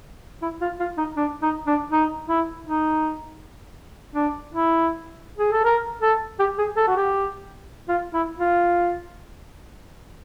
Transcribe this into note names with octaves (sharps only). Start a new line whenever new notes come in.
E4
F4
F4
D#4
D4
D#4
D4
D#4
E4
D#4
D4
E4
G#4
A4
A#4
A4
G4
G#4
A4
F#4
G4
F4
E4
F4